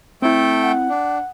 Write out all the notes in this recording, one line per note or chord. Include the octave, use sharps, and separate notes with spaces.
A3 C4 E4 A4 G5
F#5
D4